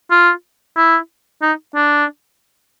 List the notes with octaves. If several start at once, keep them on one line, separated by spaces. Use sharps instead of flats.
F4
E4
D#4
D4